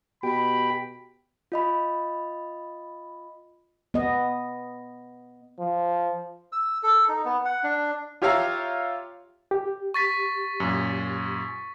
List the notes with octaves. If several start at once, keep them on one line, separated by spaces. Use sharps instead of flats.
B2 G4 G5 B5
F4 D#5 B5
B3 D#5
F3
E6
A4
D#4
B3
F#5
D4
F4 G4 C#5 E5 F5 A#5
G4
C#6 A6 B6
F#2 A#2